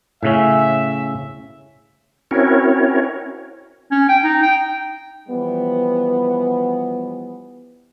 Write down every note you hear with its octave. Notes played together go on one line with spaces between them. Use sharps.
A2 C#3 C#4 E5
C4 C#4 E4 F#4 A#4 C#5
C#4
G5
D#4
G5
E3 F3 G3 B3